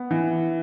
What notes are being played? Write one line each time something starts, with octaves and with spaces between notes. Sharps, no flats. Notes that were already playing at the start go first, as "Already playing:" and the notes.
Already playing: B3
E3